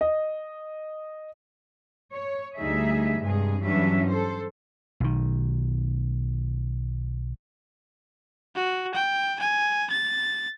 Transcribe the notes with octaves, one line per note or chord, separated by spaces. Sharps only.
D#5
C#5
D2 G3 D#4 G#4 E5
G2 C3 G#3 G#4
G2 E3 F#3 C#4 D4 E5
A4 C5
B1 D#3
F#4
G5
G#5
A6